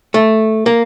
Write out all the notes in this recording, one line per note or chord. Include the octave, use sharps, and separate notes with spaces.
A3
A#3